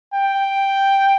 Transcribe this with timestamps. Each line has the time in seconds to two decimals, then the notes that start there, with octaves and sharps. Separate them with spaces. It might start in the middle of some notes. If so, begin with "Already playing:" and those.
0.14 G5